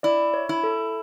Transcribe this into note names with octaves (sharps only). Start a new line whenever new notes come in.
E4 D5
C#5
E4
A4